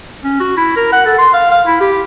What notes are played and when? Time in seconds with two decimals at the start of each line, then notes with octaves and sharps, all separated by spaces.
0.24 C#4
0.40 F#4
0.57 E4
0.76 A#4
0.92 F#5
1.06 A4
1.18 C6
1.34 F5
1.51 F5
1.67 E4
1.81 G4